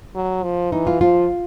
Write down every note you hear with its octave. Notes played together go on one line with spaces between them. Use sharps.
F#3
F3
E3 D#4
F4
F3 F4